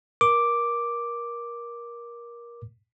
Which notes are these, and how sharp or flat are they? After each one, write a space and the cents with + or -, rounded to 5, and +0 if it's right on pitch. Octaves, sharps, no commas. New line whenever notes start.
A#4 +20 D6 +0